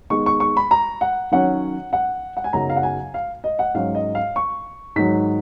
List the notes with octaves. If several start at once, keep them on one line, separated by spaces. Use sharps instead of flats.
D#3 G#3 B3 C#6
C#6
C#6
B5
A#5
F#5
D#3 F#3 C#4 F#5
F#5
F#5
G#5
F#2 C#3 F#3 B3 D#4 A#5
F5
F#5
G#5
F5
D#5
F#5
G#2 F#3 C#4 F5
D#5
F5
C#6
G#2 D#3 F#3 B6